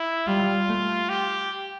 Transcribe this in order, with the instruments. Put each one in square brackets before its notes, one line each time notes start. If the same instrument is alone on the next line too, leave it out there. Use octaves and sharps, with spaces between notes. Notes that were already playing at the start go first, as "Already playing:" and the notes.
Already playing: [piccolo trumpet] E4
[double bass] G3 [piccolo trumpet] F4
[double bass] A3
[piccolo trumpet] G4